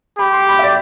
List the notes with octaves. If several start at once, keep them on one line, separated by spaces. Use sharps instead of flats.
G4 B5
C6
B5
E5
D5